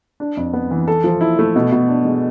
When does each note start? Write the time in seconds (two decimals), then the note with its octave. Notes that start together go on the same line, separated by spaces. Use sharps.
0.20 D4
0.37 F2
0.53 B3
0.71 E3
0.88 A4
1.04 F3
1.21 E4
1.39 A3
1.56 B2
1.72 B2
1.89 D4
2.05 G#3